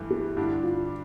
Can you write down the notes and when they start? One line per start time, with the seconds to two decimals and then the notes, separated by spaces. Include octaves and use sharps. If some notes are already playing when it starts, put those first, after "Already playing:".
Already playing: G2 E3 A3
0.10 G4
0.36 G2 D3 G3 D4 E4
0.63 F4